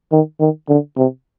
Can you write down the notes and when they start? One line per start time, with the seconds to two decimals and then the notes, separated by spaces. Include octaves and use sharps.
0.12 D#3
0.40 D#3
0.69 D3
0.97 C3